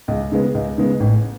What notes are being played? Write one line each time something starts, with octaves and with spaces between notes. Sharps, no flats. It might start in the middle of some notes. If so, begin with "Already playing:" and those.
C#2
C#3 G#3 B3
C#2
C#3 G#3 B3
A1